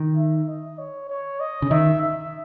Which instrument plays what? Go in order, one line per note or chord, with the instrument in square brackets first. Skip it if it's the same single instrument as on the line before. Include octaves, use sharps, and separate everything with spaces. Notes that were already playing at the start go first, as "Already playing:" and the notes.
Already playing: [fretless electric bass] D#3
[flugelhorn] E5
D#5
C#5
C#5
D#5
[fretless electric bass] C#3
[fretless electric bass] D#3 [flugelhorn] E5
[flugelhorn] E5